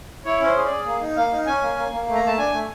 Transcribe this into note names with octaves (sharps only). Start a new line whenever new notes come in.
E4 C#5
C#4
C5
G#4
G#4 D5
A#3
D#4
A#3 F5
D#4
C#4 G#5
A#3
A#3
A#3
A3
A#5
A3 A5
D4 G#5
A3